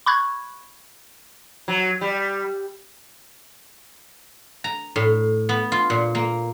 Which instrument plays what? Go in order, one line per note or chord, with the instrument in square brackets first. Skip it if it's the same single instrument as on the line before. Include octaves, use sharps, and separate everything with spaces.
[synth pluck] B5 C#6 F#6 G#6
[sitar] F#3
G3
[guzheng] A#5
A2
B3
F4
A#2
A#3